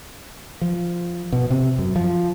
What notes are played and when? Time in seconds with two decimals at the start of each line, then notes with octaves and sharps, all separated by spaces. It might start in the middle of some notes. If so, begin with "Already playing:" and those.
0.61 F3
1.32 B2
1.50 C3
1.78 F#2
1.96 F3